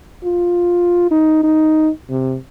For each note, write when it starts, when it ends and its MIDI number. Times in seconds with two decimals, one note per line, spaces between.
0.25 1.06 65
1.11 1.43 63
1.44 1.89 63
2.10 2.36 48